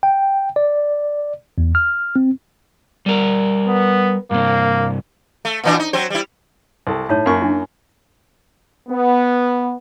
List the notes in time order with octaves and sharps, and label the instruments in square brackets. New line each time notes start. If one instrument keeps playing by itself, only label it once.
[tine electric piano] G5
D5
E2
F6
C4
[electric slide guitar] G3 A#4
[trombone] B3
[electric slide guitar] G2 C3 [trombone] A#3
[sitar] A3
A#2 E3 D4
D#4
F#3 C4 C5
G3 E4
[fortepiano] C2 A4
[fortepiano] A2 [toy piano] D#4 C#5 A5
[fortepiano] F#2 A#3 C#6 [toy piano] E4 G#5 A#5
[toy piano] D4 E4
[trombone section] B3